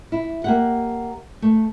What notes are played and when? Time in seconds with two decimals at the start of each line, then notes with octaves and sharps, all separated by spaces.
0.12 E4
0.44 A#3 G4 F#5
1.42 A3